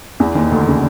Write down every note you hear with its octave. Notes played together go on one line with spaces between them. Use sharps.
E2 E3
D#2 D#3
D2 D3
C#3